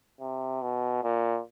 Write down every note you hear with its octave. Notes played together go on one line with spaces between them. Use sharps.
C3
B2
A#2